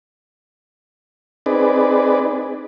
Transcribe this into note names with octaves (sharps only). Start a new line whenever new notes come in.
C4 D#4 G#4 B4 D5